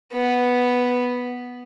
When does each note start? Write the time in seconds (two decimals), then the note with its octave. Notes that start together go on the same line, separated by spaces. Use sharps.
0.13 B3